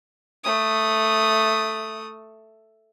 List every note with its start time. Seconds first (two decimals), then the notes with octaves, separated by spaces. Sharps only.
0.44 A3 D#6